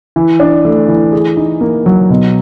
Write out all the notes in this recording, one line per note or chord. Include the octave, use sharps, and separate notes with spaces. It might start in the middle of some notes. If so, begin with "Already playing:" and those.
E3
D4
A3
E3
G#4
D#4
A#3
F#3
B2